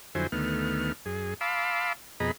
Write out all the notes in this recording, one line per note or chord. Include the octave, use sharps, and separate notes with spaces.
F2 D3 F#3 E4 C5 G#5
D2 D#3 A3 B3 F6
F#2 G#4
F5 A5 B5 C6 D6 E6
F2 B2 G#4 D#5 A#5 B5